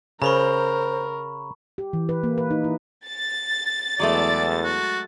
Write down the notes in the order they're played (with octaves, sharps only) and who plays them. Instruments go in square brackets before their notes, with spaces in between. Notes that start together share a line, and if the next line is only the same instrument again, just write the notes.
[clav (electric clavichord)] C#3 [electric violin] A#4 [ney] C5 [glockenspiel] A#5 B5 C#6
[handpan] G4
E3
B4
A#3
B4
D#4
E4
[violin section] A6
[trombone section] E2 [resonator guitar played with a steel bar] F#3 G#3 A3 [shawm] D5
[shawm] F#4